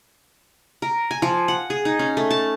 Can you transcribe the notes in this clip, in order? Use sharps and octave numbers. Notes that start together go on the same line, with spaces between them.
A#4
G#5
F3
F#5
G#4
D#4
C#4
A3
A5